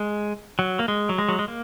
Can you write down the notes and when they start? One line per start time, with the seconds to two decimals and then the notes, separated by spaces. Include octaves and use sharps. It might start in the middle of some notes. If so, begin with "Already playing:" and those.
Already playing: G#3
0.59 F#3
0.79 A#3
0.88 G#3
1.09 F#3
1.18 G#3
1.29 F#3
1.39 G#3
1.48 A#3